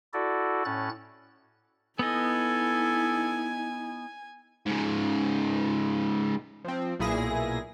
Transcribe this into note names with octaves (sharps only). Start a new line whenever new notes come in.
E4 F#4 A4 D5
A2 C#4 F#6 A6
B3 D#4 E4 A4 D#5 G#5
G#2 C#3
F3 C4
B1 A#2 E4 G#4 A#6